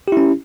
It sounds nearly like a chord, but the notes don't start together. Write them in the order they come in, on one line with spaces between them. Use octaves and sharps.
G4 E4 C#4